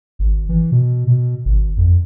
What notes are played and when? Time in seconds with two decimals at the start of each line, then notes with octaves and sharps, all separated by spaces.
0.19 G#1
0.49 E3
0.72 B2
1.07 B2
1.45 G#1
1.77 F2